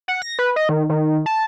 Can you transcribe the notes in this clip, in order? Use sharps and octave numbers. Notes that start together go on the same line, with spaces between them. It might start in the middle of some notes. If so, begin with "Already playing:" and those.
F#5
A#6
B4
D#5
D#3
D#3
A5